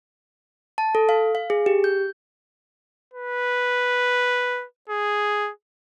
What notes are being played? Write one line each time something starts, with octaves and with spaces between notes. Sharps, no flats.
A5
A4
F5
F5
G#4
G4
G6
B4
G#4